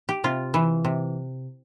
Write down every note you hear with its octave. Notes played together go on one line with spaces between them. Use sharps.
G4
C3 F4
E3
C3